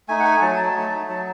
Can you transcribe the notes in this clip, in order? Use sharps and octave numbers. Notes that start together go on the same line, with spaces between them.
A3 D#4 G#5
F#5
G#5
F#3 A5
A5
A3 D#4
F#3 A5